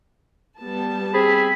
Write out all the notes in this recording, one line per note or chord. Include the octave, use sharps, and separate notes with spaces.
G3 B3 A5
C4 G#4 B5